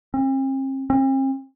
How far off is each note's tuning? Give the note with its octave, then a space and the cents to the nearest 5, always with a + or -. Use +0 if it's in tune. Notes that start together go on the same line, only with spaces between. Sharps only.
C4 +45
C4 +45